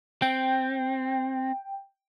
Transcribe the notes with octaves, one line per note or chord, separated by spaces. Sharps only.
C4 G5